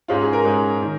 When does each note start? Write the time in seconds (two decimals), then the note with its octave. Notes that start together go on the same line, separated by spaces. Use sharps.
0.08 G#2 G#3 C#4 F4
0.21 G#4
0.33 A#4
0.45 G#2 G#3 C#4
0.82 D#3 C#4